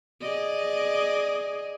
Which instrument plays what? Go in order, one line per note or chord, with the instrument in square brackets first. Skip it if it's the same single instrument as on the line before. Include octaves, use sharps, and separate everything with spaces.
[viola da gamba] G#4 D5 D#5